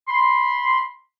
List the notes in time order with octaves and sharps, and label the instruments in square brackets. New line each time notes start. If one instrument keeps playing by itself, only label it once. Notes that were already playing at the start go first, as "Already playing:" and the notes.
[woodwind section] B5 C6